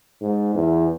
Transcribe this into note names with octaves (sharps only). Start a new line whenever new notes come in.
G#2
E2